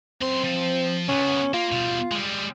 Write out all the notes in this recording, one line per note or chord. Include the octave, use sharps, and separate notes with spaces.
F#2 C4 C6
F3
C#3 B3 C#4
A#3 F4
B2 G3
G3 G#3